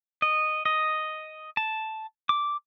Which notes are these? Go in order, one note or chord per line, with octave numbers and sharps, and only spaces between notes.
D#5
D#5
A5
D6